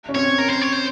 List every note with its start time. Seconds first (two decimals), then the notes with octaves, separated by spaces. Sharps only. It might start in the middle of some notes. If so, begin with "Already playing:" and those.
0.09 C#4
0.15 C4 C#5
0.38 A#4
0.50 C5
0.61 C#5
0.73 C5